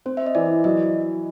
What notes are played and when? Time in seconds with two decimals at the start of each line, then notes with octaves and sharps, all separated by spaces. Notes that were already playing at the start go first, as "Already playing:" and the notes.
0.06 C4 C5
0.17 E5
0.26 D#5
0.35 E3 D5
0.64 F#3 D#5